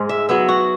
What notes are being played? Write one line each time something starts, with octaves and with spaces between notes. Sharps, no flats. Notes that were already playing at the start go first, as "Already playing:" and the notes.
Already playing: G#2 G#3
E5
F#3 B3 E5
F#4